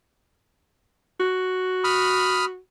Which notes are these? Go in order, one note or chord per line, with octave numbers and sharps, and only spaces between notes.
F#4
B5 D#6 F6